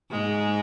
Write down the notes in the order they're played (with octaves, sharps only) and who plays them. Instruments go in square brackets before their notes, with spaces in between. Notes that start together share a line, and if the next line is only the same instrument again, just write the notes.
[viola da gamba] G#2 G#3